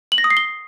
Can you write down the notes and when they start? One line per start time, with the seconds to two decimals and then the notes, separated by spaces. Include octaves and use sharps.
0.12 F#7
0.18 A#6
0.24 D#6
0.30 C7
0.37 G7